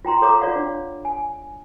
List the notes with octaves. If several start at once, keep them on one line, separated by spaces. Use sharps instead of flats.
F4 G5 A#5 C6
A4 C#5 F5 A#5 D6
F4 C#5 D5 F5 F#5
D4
G#5